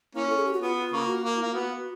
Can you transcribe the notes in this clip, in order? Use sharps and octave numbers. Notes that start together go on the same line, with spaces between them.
A#3 C#4 E4
A4
G#4
G4
F#4
B3 F4
C#3 A#3
F#4
A#3
E4
A#3 F4
B3 F#4